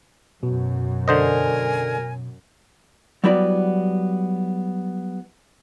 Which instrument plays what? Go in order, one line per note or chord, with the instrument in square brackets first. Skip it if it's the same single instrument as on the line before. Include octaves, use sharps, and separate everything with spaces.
[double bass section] F#2 [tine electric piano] B2
[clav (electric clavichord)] D3 C5 D#5 [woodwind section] A#4 G#5
[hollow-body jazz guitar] F#3 G3 B3 E4 F#4 D5